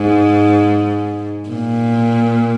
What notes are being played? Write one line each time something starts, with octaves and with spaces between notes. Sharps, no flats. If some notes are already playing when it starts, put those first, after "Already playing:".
Already playing: G#2
A#2